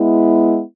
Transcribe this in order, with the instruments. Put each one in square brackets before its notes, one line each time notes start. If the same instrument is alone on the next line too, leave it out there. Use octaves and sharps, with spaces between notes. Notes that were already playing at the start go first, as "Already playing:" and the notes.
Already playing: [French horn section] G#3 B3 E4